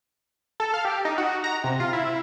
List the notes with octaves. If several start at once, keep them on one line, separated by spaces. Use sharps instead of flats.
A4
F5
G4
D#4
F#4
A#5
C3
F4
E4